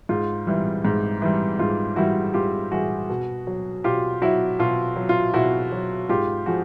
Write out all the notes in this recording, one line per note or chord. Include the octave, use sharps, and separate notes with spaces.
G#2 F4
E3 G3
G#2
E3 G3
G#2 F4
E3 G3 E4 F#4
G#2 F4 G4
E3 G3 F#4 G#4
B2
F#3
B2 F4 G4
F#3 E4 F#4
B2 F4
F#3
F4
B2 E4 F#4
F#3
G#2 F4 G4
F3 F#4 G#4